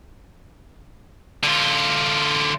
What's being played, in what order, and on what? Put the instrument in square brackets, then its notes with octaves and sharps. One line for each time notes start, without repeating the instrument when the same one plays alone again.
[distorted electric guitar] D3 F4